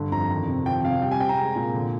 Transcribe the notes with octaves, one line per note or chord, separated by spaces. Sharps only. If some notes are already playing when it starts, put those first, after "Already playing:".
Already playing: G2 D3
F2 A#5
D#3
C3
F3 G5
C3 F5
G3 G5
G#5
C3 G5
A#5
G#3
A#2
D3